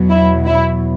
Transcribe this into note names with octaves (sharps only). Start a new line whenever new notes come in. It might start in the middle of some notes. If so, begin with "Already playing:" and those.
Already playing: E2 B2 F#3
E4
E4